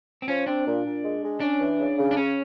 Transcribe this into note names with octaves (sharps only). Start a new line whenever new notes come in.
C4
F3 C#4
C4 D4
A#2
A#2
G#3
G#3
C#4 D4
E3
C#3
C#3
D4
C#3 C#4